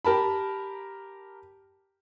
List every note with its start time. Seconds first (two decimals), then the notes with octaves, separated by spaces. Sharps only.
0.05 G4 A#4 A5 B5